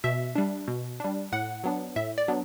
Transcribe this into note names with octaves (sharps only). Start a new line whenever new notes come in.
B2 E5
G3 D4
B2
G3 D4
A2 F#5
F#3 B3 D4
A2 E5
D5
F#3 B3 D4